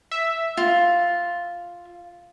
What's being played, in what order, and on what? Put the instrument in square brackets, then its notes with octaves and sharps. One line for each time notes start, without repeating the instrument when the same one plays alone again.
[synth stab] E5
[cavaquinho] F4